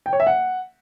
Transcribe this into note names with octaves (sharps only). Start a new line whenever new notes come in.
G5
C#5
E5
F#5